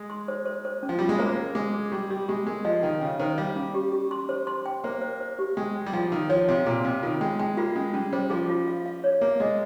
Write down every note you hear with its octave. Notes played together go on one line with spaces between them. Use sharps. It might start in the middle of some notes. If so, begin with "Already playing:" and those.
Already playing: G#3
C6
C5
C5
C5
C#4
F3
G3 F4
G#3
A#3 C5
C5
G#3 G#4
G#4
G3 G4
G3 G4
G#3 G4
G#3 A#4
F3 D#5
D#3 G5
C#3 G5
D#3 C5
G3 F5
C#4
G4
G4
C6
C5
C6
G5
A#3 C5
C5
C5
G4
G#3 G5
G5
G3
F3 G5
D#3 A#4
F3 C#5
C3 F5
A#2 G#4
C3 F5
D#3 F4
G#3 G5
G#3 G5
A#3 F4
G#3 C#4
G3 C#4
G3 C5
F3 G#4
F4
F5
F5
C#5
A#3 G#4
G#3 D#5